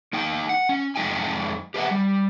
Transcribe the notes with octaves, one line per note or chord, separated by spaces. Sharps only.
A#3 D#4 G5
F#5
C#4
F2 G#2 G#3 D#4 G5 G#5
G4 B4 E5 F#5
G3